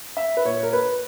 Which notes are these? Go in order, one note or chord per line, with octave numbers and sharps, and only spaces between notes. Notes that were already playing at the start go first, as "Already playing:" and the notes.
E5
B4
A#2 C#5
A#4
B4